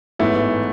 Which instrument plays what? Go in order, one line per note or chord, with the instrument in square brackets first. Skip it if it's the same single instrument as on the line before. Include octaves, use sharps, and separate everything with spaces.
[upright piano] A1 G#2 E3 B3 E4 [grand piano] A3